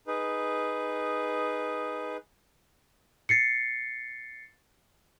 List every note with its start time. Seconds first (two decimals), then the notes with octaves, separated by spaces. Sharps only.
0.07 D#4 G#4 B4
3.29 A6 C7 C#7